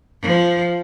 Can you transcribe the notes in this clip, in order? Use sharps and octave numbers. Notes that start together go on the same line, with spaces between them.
F3